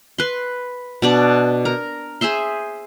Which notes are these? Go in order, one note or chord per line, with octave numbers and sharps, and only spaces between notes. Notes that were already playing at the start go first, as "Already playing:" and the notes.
B4 C6
B2 D4 D5
A#4
G#4 C5 E5 C6